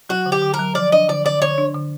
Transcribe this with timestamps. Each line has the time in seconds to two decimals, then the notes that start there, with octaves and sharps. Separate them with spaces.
0.09 F#3 F#4
0.26 D3
0.32 G4
0.42 D3
0.54 A#4
0.59 F#3
0.75 F3 D5
0.92 D4 D#5
1.09 D3 D5
1.25 D3 D5
1.42 D3 C#5
1.58 D4
1.74 D3